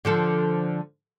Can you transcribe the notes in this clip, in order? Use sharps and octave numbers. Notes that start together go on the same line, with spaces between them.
D3 F3 A4